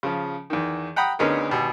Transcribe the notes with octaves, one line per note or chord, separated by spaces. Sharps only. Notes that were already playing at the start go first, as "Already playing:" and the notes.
C#3 F3
E2 D#3
F#5 G5 A#5 B5 D#6
D2 B3 C#4 D#4 G#4 A#4
G#1 B2 G4